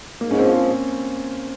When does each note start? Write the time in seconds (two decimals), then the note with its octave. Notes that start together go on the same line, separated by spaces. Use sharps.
0.21 G#2 A#3
0.31 C#4
0.39 F3 C4
0.57 G#2 C#4